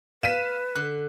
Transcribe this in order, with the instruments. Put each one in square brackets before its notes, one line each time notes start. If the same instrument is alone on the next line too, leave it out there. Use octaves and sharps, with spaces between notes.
[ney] B4 [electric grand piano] F5 [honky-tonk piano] B6 D#7 E7
[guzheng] D3 [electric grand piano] F#6